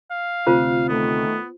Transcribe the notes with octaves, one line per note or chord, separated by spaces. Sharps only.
F5
D2 C3 F4 C5
D#3 A3 B3